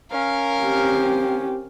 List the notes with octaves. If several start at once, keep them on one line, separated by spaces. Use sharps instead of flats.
C#4 A#4 F5
C4 G4